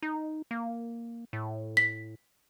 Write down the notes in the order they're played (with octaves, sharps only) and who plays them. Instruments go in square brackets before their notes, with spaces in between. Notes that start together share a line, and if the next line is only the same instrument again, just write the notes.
[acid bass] D#4
A#3
A2
[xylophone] B6